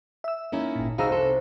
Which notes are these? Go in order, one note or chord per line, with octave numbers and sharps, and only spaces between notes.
E5 E6
A#3 C#4 D#4 E4
G#1 A#2
C2 D#4 F#4 G#4 F5 A#5 E6 A#6
C3 A4 C6 F#6